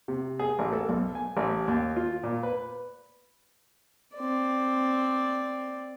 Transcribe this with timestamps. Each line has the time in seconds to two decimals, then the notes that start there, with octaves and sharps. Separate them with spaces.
0.08 C3
0.39 G#4
0.59 A1
0.73 A4
0.89 B1
1.15 G#5
1.37 A1
1.68 D#2
1.97 F4
2.23 A#2
2.43 B4
4.16 C4 D5